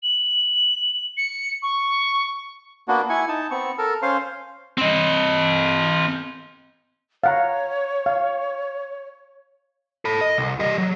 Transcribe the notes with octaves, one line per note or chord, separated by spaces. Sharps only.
F#7
C#7
C#6
A#3 B3 D4 F#4
E4 G#5 C#6
D#4 A5
B3 C4 C#6
A4 A#4
C#4 C5 F5 C6
C4 D#5
C#5 F5 F#5 A#5
F5
A4 B5
D#5
C2
G3 D#5
F#3